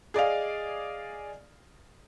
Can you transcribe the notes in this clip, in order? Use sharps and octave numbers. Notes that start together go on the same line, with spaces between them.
G#4 D5 D#5 F5